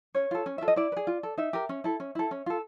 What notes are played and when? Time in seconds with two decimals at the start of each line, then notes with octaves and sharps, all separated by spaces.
0.15 C#4 C#5
0.31 F4 A4
0.46 C#4
0.58 F4 A4 E5
0.68 D#5
0.76 E4 D5
0.92 B4
0.97 G#4
1.07 F4
1.23 A4
1.38 D#4 E5
1.53 G4 A#4
1.69 C#4
1.84 E4 A4
2.00 C#4
2.15 E4 A4
2.31 C#4
2.46 F4 A4